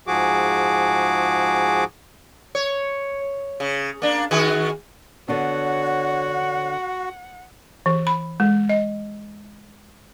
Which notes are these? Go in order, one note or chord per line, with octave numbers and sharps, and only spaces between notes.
G#2 F3 F#4 G#4 D6
C#5
C#3
A#3 D4
D#3 F#4 G#4
D3 B3 D4 F#4 C#5 F#5
E3
B5
G#3
D#5